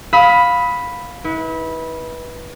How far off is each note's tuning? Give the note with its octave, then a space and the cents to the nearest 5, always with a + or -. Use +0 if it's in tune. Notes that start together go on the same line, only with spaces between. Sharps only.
F5 +15 B5 +0 D#6 +35
E4 -40 B4 -15